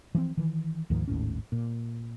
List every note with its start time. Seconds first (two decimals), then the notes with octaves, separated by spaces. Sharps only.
0.15 E3 F3 B3 C4
0.37 D#3 E3
0.90 D2 G#2 D#3 F3
1.08 G#1 D#2 A2 C#4
1.52 A#2